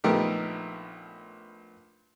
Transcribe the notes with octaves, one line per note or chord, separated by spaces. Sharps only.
A#1 A3 B3 D#4 G4 A#4